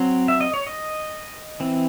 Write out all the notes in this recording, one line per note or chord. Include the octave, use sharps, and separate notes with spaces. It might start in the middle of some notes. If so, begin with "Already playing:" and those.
Already playing: F#3 C4
E5
D#5
C#5
D#5
E3 C4